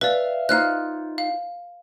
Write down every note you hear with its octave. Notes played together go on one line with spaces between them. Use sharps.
B4 D5 E5 F5
D#4 F4 C5 F5 F6 F#6
F5